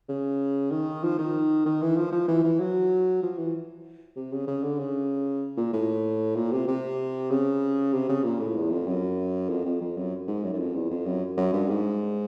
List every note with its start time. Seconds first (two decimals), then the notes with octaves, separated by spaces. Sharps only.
0.09 C#3
0.71 D#3
1.03 F3
1.19 D#3
1.66 D#3
1.82 E3
1.97 F3
2.12 F3
2.28 E3
2.44 E3
2.59 F#3
3.23 F3
3.38 E3
4.16 C3
4.32 C#3
4.47 C#3
4.63 D3
4.79 C#3
5.57 A#2
5.73 A2
6.35 A#2
6.52 C3
6.68 C3
7.30 C#3
7.93 C3
8.09 C#3
8.24 A#2
8.40 A2
8.56 E2
8.71 F2
8.87 F#2
9.49 F2
9.66 F2
9.81 F2
9.97 F#2
10.27 G#2
10.43 F#2
10.54 F#2
10.59 F2
10.75 E2
10.90 F2
11.06 F#2
11.37 F#2
11.53 G2
11.69 G#2